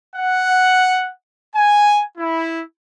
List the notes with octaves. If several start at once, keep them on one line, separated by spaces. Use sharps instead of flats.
F#5
G#5
E4